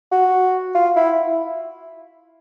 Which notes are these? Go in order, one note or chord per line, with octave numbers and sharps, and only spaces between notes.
F#4
F4
E4